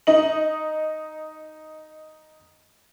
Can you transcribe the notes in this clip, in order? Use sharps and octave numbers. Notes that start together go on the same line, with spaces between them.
D#4 D#5 F#7